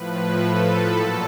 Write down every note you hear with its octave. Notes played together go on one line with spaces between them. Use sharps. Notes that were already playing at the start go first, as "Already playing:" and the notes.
Already playing: A2 F3 B4
A4
A#2 F#3 A4